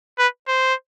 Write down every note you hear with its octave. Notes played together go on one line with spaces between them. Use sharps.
B4
C5